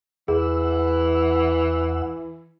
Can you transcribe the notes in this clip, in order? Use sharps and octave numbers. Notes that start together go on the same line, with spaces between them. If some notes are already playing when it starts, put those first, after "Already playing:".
E2 E3 G#4 F#5 E6